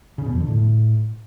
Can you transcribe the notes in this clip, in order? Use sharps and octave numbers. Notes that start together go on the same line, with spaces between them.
C#3
B2
F2
D3
A2